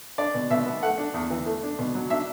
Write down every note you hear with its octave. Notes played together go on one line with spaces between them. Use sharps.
D4 D5
B2
B2 E5
B3
A3 F#5
D4
E2
E3
A3
D4
B2
F#3
D4 E5